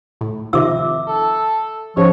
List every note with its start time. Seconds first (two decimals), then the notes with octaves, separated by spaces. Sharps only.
0.21 A2
0.53 C3 D#3 F3 E5 D6 E6
1.07 A4
1.97 G#2 F3 C#4 C#5